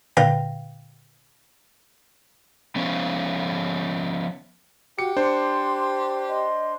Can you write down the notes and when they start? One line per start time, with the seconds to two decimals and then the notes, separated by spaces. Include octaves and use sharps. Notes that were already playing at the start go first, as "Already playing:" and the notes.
0.17 A#2 D3 B4 F5 G5 A#6
2.76 F3 B3 C#4
4.99 F#4 G4 C#7
5.16 D4 C5 C6
6.29 D#5 C6